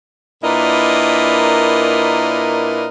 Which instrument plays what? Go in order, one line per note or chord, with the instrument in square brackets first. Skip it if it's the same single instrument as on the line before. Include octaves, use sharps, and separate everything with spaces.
[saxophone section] A#2 D4 E4 A#4 B4 D#5